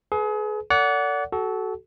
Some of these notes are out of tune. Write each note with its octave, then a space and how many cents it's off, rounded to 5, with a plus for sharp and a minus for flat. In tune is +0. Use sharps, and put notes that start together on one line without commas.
G#4 +35 B4 +0
A4 +45 D5 -35 F#5 +0
F#4 +25 A4 -20